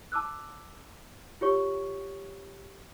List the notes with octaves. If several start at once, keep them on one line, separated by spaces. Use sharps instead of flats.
A5 D6 E6 F#6
F4 G4 C#5 C#6